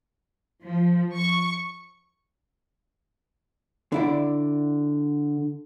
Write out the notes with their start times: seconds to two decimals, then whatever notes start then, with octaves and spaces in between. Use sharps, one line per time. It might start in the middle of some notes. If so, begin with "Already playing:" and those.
0.65 F3
1.16 C#6
3.92 D3 E4 D5